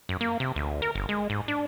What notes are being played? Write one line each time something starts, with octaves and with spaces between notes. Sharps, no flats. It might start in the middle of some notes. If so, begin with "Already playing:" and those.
F#2
A#3
C3
D2
A#4
G1
G#3
G#2
D4